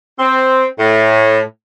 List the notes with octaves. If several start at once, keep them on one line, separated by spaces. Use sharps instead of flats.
C4
A2